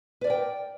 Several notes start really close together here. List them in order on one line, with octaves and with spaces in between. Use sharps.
B4 D5 A#4 G5